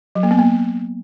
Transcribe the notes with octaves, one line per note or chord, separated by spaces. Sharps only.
F#3
A#3
B3
A#3